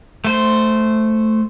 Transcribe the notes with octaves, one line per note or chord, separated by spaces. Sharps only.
A3 C5